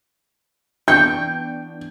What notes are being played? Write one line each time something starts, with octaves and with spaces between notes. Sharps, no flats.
E3 B3 D4 G5 C#6 G6